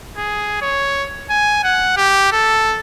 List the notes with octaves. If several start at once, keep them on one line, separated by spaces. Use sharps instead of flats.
G#4
C#5
G#5
F#5
G4
A4